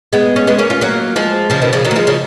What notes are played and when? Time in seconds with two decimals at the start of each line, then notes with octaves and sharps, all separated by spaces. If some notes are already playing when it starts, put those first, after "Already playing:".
0.13 G#3 B3
0.36 C#4
0.47 G#3 B3
0.58 A#3 C#4
0.70 C#4 F4
0.81 F#3 A#3
1.16 F3 G#3
1.50 C#3 F3
1.62 B2 D#3
1.73 C#3 F3
1.85 D#3 F#3
1.91 A#3
1.96 F3 G#3
2.07 C#3 F3